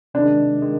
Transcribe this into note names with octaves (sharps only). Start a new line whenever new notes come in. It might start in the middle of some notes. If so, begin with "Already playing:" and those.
C3 D#3 G#3 D4
D#3 G#3